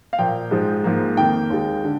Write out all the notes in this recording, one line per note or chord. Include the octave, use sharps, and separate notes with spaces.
F5
A#2 F3 A#3 G5
G#2 F3 G#3
G#2 F3 A#3
F2 D#3 A#3 G5
D#2 D#3 G#3
D3